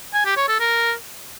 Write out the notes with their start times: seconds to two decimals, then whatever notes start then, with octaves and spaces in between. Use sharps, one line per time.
0.14 G#5
0.25 G4
0.37 C#5
0.48 A4
0.60 A#4